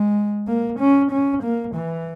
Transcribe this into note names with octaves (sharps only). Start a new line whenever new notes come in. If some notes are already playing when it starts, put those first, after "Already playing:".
Already playing: G#3
A#3
C#4
C#4
A#3
E3